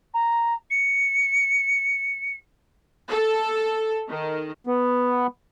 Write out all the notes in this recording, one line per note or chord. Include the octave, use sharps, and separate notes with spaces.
A#5
C#7
A4
D#3
B3